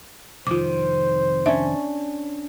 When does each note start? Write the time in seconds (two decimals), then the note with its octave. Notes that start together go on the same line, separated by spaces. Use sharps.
0.47 C2 F2 D#3 F4 C5 D6
1.46 C#4 D4 E5